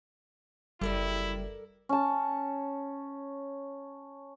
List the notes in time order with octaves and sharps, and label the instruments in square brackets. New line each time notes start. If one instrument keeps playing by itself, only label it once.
[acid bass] F#1 [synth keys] G3 [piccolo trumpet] E4 [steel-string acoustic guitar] A4 A#4 D5
[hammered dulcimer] C#4 A5